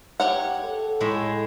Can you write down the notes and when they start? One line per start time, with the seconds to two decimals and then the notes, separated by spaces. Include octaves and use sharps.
0.20 G4 C#5 F#5
0.65 A4
1.00 A2 G#3 E5